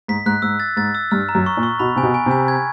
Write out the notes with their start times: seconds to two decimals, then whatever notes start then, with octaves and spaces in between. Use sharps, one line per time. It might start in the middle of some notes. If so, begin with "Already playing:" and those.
0.08 G#2 B6
0.26 G#2 F#6
0.42 G#2 E6
0.60 A6
0.77 G#2 A6
0.95 E6
1.11 G2 F6
1.29 A#5
1.35 F#2
1.46 C#6
1.57 A#2
1.63 C#6
1.79 B2 B5
1.96 C3 G#5
2.03 B2
2.14 G#5
2.26 C3
2.31 G#5
2.48 G#6